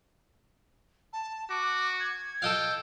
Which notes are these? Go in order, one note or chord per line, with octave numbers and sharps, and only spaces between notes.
A5
F#4 D6
G#6
A4 D#5 F5 G5